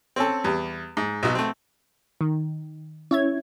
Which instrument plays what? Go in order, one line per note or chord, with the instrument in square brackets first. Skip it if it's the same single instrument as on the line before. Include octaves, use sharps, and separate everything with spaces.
[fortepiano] C4 C#4 A4
E2 G3
G#2
B1 B2
A3 C4
[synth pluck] D#3
[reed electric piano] C#4 E4 [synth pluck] C#5 E5 G#6